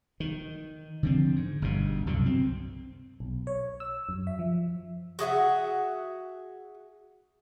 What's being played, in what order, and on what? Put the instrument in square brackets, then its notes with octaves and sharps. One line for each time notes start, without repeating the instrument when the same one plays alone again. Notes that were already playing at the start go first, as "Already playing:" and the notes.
[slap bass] D#3
D3 F3 C4
G#2
G1 G2 B2
C2 F#2 B2 D3
C4
[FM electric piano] B1
C#5
E6
F#2
E5
F3
[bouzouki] F#4 G#4 E5 F#5